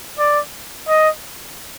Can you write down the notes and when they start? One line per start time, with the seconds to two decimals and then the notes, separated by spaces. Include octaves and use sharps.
0.19 D5
0.88 D#5